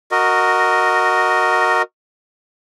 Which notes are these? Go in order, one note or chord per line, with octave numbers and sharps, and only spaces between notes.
F#4 A#4 D#5